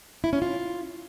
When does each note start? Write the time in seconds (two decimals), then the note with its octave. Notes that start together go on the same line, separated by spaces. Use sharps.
0.24 E4
0.33 C#4
0.42 F4